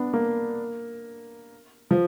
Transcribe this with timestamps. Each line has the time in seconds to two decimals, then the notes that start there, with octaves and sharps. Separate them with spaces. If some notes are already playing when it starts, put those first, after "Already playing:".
Already playing: B3 D4
0.14 A#3
1.91 F3